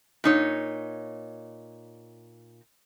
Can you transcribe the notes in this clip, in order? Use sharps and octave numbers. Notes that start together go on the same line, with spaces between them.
A#2 D#4 C#5